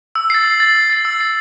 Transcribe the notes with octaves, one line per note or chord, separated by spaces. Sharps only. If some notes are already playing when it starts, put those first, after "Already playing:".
E6
A6 C7
E6
A6 C7
E6
A6 C7
E6
A6 C7